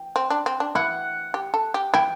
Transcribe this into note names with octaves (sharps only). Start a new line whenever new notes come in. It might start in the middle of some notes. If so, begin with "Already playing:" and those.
Already playing: G5
C4
D4
C4
D4
E4 F#5
G4
A4
G4
E4 G5